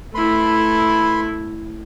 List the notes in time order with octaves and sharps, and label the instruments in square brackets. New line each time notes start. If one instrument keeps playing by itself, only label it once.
[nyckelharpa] A3 E4 [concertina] B4 B5 C6